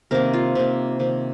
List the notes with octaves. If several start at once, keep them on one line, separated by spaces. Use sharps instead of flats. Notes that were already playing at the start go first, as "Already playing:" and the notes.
C3 D#3 A#3 A#4
F4
C3 D#3 A#3
C3 D#3 A#3